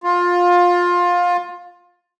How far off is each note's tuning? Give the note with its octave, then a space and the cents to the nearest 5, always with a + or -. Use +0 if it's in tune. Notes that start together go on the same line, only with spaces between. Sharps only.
F4 +20